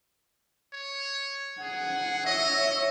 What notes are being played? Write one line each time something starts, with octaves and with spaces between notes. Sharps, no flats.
C#5
G#4 F#5
C#5 D#5 E5